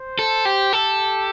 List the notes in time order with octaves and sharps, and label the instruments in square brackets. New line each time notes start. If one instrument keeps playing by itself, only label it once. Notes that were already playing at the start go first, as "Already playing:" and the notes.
Already playing: [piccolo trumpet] C5
[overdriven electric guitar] A4
G4
[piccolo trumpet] G4 [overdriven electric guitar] A4